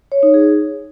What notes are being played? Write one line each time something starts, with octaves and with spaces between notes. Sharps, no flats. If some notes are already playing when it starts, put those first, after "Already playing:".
C#5
D#4
G#4